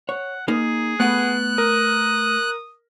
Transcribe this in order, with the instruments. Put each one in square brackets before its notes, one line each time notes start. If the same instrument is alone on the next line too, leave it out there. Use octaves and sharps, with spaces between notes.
[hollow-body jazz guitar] C#5 [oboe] F#5
[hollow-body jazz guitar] A#3 D#4 A#4 [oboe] G#4
[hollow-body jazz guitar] A3 B4 F#5 [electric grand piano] B3 [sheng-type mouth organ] F#6
[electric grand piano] A#4 [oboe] D#6